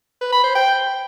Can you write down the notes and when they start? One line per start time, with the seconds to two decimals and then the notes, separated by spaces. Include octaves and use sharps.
0.21 B4
0.32 B5
0.44 C5
0.55 G5